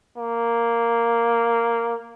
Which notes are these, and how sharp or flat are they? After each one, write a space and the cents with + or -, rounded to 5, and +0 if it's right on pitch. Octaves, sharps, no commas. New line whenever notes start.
A#3 -5